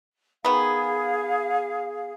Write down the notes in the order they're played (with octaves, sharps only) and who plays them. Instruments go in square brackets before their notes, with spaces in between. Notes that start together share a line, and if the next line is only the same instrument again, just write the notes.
[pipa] D#3 B3 [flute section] G#4 F5